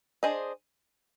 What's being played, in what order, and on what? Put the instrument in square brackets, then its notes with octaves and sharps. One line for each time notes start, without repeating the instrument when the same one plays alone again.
[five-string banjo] D4 G#4 C5 D#5